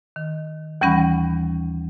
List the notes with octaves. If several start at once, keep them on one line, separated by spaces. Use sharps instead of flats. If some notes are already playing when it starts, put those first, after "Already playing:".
D#3
D#2 E3 G3 C#4 F#5 B5